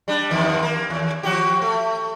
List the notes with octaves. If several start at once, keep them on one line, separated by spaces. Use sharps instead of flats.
G3 D4
E2 G2 D#3
A#3
D#2
F3 F#4 G4
A3